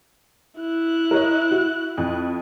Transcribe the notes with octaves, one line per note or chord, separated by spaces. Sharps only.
E4 F#6
A#4 C#5 D#5
F#4
F2